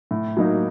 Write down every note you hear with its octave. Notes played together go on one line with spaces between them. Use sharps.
A2
F#3 A#3 D#4